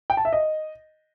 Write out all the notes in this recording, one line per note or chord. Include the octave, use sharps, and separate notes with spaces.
G5
A5
E5
D#5